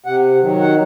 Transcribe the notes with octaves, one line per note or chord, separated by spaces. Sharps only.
C3 F#5
D#3 F#3
F#5